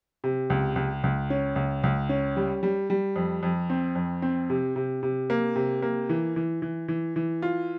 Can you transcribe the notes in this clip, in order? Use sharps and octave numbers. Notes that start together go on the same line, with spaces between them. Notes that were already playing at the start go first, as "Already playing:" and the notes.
C3
C#2
C#2
C#2
C#4
C#2
C#2
C#4
G3
G3
G3
F2
F2
C4
F2
C4
C3
C3
C3
A#3
C3
A#3
E3
E3
E3
E3
E3
F4